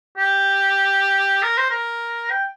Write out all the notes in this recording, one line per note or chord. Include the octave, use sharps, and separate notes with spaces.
G4
A#4
C5
A#4
G5